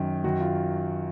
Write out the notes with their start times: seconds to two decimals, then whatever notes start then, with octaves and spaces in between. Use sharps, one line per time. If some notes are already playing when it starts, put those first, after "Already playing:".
Already playing: F#2 D#3
0.24 F#2 D#3 F#4
0.40 F4